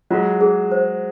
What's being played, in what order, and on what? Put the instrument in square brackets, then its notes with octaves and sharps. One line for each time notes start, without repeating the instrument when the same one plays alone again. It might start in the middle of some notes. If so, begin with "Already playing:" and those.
[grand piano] F#3 G#3 [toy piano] F4
[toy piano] G#4
C5